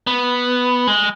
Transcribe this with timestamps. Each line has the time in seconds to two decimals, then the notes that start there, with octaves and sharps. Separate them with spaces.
0.07 B3
0.87 G#3